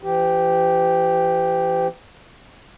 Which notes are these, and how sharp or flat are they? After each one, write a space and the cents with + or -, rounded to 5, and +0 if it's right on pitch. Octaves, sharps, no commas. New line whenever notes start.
E3 +45 G4 +0